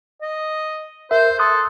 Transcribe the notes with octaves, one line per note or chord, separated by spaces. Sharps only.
D#5
A#4 C5 E5
A4 C6 D#6 F#6